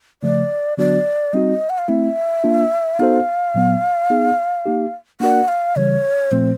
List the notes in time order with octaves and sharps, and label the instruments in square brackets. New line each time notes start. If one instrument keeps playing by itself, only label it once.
[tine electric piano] C#3 F3 A3 [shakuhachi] D5
[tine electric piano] D3 F#3 B3 D4 F#4 [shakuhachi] D5
[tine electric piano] G3 C4 D#4 F#4 [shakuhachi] D#5
[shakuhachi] F#5
F5
[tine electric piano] A3 C4 E4 [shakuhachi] E5
[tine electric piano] A#3 D4 F4
[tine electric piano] B3 D#4 F#4 A4 C5 [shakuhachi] F5
[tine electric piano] A#2 F#3 B3
B3 D#4 G#4
A#3 D#4 G4
[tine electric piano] A#3 D4 F#4 A#4 D5 [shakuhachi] F#5
[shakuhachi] F5
[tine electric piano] C#3 E3 G3 [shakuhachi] C#5
[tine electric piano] A#2 F3 A3 C4 [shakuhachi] C5